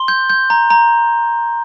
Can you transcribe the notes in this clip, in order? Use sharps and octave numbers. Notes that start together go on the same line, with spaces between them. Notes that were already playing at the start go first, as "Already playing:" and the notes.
Already playing: C6 G7
G6
G6
A#5
A#5